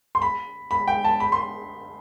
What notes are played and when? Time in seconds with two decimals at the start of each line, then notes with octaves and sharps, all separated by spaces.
0.15 C6
0.22 B5
0.71 B5
0.88 G5
1.04 A5
1.20 B5
1.32 C6